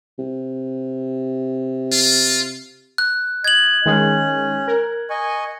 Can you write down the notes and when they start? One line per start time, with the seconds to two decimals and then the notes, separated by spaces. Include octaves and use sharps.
0.19 C3
1.92 F4
2.98 F#6
3.44 D#5 G#6 F#7
3.86 D#3 G#3 C#4
4.68 A#4
5.10 D#5 G#5 C#6